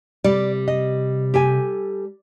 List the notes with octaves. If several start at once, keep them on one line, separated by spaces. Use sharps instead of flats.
C3 G3 D5
D#5
G4 A4 G#5